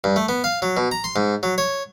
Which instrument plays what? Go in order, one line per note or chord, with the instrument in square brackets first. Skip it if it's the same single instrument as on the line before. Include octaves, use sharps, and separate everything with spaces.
[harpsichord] G2
A3
B3
F5
F#3
B2
A#5
C6
G#2
F#3
C#5